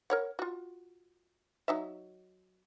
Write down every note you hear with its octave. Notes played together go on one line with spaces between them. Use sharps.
A#4 C#5 F#5
F4 F#4
F#3 D#4 E5